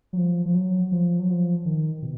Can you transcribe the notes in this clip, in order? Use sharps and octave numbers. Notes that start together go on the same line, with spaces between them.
F#3
F3
F3
F#3
F3
F#3
F3
D#3
B2